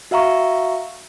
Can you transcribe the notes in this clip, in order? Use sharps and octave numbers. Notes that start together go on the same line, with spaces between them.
F#4 E5 F5 A#5 C#6